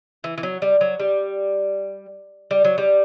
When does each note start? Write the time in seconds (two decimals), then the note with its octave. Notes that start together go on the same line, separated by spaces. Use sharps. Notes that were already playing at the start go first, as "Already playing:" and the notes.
0.24 E3
0.38 E3
0.43 F#3
0.62 G3
0.81 F#3
1.00 G3
2.51 G3
2.65 F#3
2.78 G3